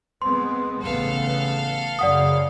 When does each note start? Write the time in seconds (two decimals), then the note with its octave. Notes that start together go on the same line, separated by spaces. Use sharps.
0.22 G#3 B3 C4 C6
0.82 A1 C#3 B3 A4 F5
1.99 F#2 C#3 D5 F#5 D#6